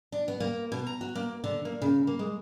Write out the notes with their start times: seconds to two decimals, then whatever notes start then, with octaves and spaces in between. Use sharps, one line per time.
0.12 D4
0.28 B3
0.40 A#3
0.72 B2
0.87 A#5
1.01 F#4
1.15 A#3
1.44 D3
1.65 A#3
1.82 C#3
2.07 A#3
2.19 G#3